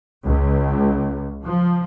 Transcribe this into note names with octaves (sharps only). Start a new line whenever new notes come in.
C#2
F3